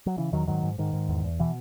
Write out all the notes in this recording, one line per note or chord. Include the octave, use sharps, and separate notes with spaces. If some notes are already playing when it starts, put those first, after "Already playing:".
F#3
C#3 E3
E2 D#3 F#3
G#2 D#3 F#3
G#2
G#2 D#3
G#2
E2
E2
B2 E3